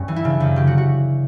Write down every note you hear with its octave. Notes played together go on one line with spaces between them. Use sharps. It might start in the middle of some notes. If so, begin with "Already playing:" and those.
Already playing: G2 C#4
E3
E4
C#3 D4
F#2
C#3 G4
F#4
F#4